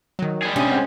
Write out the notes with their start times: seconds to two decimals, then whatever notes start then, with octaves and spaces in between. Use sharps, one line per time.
0.19 D#3 F#3
0.42 G3 G#4
0.56 C3 C#4 D4 D#6 D#7
0.71 G#3 C4 F#5